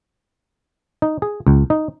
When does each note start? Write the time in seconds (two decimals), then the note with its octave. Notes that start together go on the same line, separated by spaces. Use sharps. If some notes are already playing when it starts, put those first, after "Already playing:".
1.02 D#4
1.22 G#4
1.47 C#2
1.70 D#4